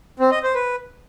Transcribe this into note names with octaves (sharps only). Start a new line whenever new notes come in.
C4
D#5
C5
B4